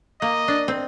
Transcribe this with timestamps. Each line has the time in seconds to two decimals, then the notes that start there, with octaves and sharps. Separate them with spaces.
0.21 A#3 D#5
0.48 D4
0.68 C4